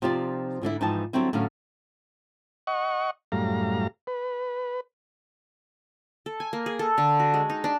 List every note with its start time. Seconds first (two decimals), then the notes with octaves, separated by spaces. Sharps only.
0.02 C3 F3 D#4 F4 G4 D5
0.62 G#2 D3 D4 E4
0.81 G#2 E3 F3 D#4 G5 A5
1.13 D3 F#3 G3 C4 E4
1.33 A2 D3 F#3 C#4 F5
2.67 D#5 F#5 C#6
3.32 F#2 A2 G3 F5 A#5
4.07 B4
6.26 A4
6.40 G#5
6.53 A#3
6.66 G#4
6.79 A4
6.98 D3
7.20 F#4
7.34 G#3
7.50 D#4
7.64 D4